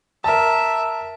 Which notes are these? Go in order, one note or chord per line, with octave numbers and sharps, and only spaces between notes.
A#4 E5 A5